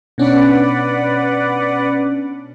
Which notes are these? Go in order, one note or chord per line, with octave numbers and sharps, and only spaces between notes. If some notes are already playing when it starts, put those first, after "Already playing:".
B2 C#4 D4 B4 D5 F#5